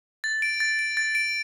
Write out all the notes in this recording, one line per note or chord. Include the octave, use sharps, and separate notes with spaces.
A6
D7
A6
D7
A6
D7